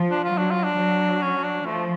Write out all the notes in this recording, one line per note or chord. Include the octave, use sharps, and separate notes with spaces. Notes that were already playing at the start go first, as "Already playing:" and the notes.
Already playing: F3
D4
F4
F#3 D4
F4
D4
F#3
C#4
D4
F3 A3